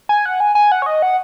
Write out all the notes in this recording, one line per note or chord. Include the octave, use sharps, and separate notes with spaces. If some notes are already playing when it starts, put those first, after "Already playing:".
G#5
F#5
G#5
G#5
F#5
C#5
D#5
F#5